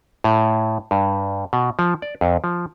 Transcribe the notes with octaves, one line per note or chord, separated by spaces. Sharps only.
A2
G2
B2
F3
D5
F2
F3